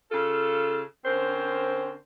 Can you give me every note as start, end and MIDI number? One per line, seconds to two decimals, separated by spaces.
0.11 0.81 49
0.11 0.81 65
0.11 0.81 69
1.05 1.95 50
1.05 1.95 60
1.05 1.95 61
1.05 1.95 70
1.05 1.95 72